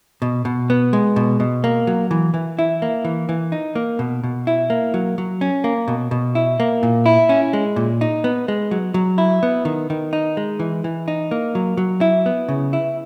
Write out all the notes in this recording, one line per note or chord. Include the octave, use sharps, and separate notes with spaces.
B2
B2
B3
G#3
B2
B2
A#3
F#3
E3
E3
E4
A#3
E3
E3
D#4
A#3
B2
B2
E4
A#3
F#3
F#3
C#4
A#3
B2
B2
E4
A#3
A#2
E4
C#4
G#3
A#2
D#4
B3
G#3
F#3
F#3
E4
B3
D#3
D#3
D#4
G#3
E3
E3
D#4
A#3
F#3
F#3
E4
B3
C#3
E4